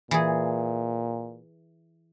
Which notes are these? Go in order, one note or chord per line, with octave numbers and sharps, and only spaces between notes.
A#2 E3 G#4